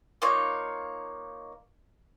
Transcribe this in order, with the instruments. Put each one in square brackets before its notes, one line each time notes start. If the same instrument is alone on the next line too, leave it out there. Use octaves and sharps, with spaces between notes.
[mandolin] A#3 D#4 F4 C#5